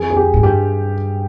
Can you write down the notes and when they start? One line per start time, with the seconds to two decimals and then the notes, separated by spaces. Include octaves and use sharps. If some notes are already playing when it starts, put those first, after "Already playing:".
Already playing: F2 G#4
0.10 G#4
0.17 G4
0.34 G#2
0.43 G2 G4